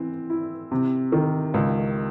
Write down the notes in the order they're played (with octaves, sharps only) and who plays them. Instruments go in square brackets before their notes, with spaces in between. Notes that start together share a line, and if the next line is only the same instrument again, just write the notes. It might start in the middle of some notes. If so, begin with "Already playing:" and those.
Already playing: [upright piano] E3 C4
E4
C3
D#3
C#2